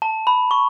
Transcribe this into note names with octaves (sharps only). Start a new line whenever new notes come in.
A5
B5
C#6